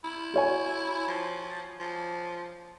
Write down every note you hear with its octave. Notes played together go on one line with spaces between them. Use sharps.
E4
F#4 C#5 G#5
F3
F3